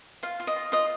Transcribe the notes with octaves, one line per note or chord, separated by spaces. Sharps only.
F4 F5
F4
D#5
F4
F4 D#5